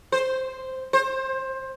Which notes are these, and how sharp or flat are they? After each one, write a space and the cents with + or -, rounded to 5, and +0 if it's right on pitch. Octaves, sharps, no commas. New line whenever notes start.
C5 -5
C5 +20